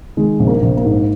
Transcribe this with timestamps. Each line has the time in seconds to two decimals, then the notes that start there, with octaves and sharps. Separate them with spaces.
0.17 D#3 G#3
0.40 A#1
0.47 A#3
0.62 A#1
0.77 A#3
0.84 G#2